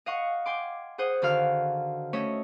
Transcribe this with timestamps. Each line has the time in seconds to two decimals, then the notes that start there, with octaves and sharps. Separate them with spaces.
0.06 D#5 F5 F#5 C#6
0.46 G5 G#5 C6 D6
0.98 G#4 C5 F#5 D#6
1.22 D3 D#3 F#4 F5 F6
2.13 A3 C#4 C#5 D#5 E5